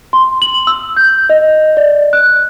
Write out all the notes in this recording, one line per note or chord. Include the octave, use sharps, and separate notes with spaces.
C6
F#7
E6
G6
D#5
D5
F#6